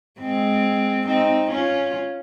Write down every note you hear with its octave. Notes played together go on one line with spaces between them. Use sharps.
G#3 C4
C4 D#4
C#4 F4